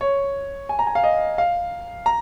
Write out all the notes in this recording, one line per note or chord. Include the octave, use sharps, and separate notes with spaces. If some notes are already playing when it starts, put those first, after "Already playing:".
C#5
G#5
A#5
G#5
F5
D#5
F5
A#5